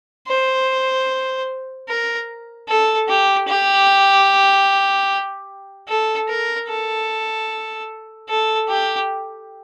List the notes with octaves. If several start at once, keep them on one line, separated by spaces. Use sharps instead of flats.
C5
A#4
A4
G4
G4
A4
A#4
A4
A4
G4